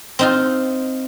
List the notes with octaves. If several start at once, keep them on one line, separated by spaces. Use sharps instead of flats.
C4 D#4 F4